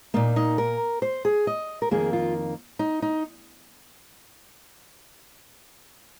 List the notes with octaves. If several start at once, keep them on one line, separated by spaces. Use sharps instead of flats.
A#2 A#3 D#4
D#4
A#4
C5
G#4
D#5
A#4
F2 D#3 A#3 G#4
F4
D#4
D#4